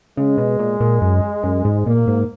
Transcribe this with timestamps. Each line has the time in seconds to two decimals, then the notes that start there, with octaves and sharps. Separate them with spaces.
0.17 C#3 G#3
0.38 B2
0.59 A#2
0.80 A#2
1.02 F#2
1.43 F#2
1.65 G#2
1.86 A#2 A#3
2.07 G#2